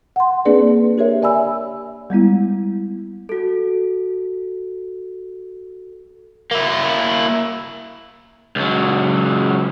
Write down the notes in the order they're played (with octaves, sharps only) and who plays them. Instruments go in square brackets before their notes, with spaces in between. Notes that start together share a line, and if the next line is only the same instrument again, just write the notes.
[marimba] F#5 C6
A#3 C4 D4 G#4 B4 D5
G4 A#4 C#5 E5
D5 E5 G#5 B5 E6
G3 G#3 B3 E4
[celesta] F#4 A4
[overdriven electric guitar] A#3 E4
C#2 F#3